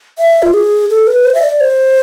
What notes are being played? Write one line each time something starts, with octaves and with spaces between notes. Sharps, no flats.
E5
F4
G#4
A4
B4
C5
E5
D5
C5